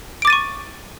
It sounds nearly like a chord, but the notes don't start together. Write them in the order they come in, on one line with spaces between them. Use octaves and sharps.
D7 D6 A6 D#7 C#6